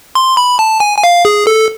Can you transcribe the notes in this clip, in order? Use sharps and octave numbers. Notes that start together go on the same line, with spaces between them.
C6
B5
A5
G#5
G#5
F5
G#4
A4